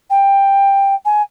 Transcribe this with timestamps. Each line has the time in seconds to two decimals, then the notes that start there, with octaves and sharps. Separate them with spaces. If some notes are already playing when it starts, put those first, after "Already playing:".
0.10 G5
1.05 G#5